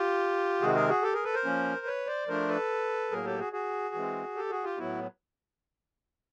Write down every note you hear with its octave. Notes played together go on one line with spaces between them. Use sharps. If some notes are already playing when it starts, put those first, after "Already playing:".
Already playing: F4 G4
C3 D#3 G#3 C4 F#4 G#4
G#4 A#4
F#4 G#4
G4 A4
G#4 A#4
A4 B4
A#4 C5
F3 A#3 C#4
B4 C#5
C5 D5
F3 A3 D4 A#4 C5
A4 B4
A2 F#3 A#3 G#4 A#4
G4 A4
F#4 G#4
F#4 G#4
E3 G#3 C4
G4 A4
F#4 G#4
F4 G4
A2 F#3 B3 E4 F#4